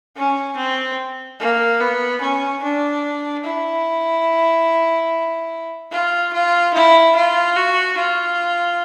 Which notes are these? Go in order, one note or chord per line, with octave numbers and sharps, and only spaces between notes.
C#4
C4
A#3
B3
C#4
D4
E4
F4
F4
E4
F4
F#4
F4